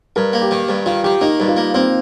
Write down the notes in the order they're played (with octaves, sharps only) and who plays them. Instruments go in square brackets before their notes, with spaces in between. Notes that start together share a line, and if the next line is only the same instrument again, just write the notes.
[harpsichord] G2 [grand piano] A#4
[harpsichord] A#3
[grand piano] G4
[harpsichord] D#3
G2
[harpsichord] D#3 [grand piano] F4
[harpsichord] D#3 [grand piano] G4
[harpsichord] A#3 [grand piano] D#4
[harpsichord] G2
[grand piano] F4
[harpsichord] A#3
[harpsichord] A#3 [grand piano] C4